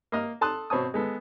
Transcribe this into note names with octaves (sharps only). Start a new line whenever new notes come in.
A#3 D#5 F6
A4 A5 C6 D#6 F#6
B2 C4 C#5 A5 D#6
G#3 B3 A4